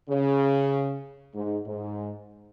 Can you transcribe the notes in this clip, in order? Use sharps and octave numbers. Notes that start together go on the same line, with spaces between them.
C#3
G#2
G#2